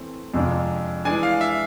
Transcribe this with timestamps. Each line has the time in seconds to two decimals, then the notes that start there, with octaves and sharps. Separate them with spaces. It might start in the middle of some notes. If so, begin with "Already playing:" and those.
Already playing: E3 A3 C4
0.34 F2 C3 G#3 D4 F4
1.05 E3 G#3 D4 G#5
1.23 F5
1.41 E5